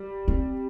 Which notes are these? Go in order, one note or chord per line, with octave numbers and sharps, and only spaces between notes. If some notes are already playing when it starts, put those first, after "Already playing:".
Already playing: G3
C4